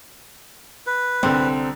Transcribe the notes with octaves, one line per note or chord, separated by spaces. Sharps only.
B4
C2 D3 C4